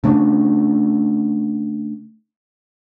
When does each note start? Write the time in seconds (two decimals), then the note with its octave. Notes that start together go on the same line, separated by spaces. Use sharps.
0.04 C#3 A3 C4 D4